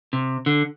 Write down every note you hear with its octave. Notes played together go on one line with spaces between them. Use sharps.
C3
D3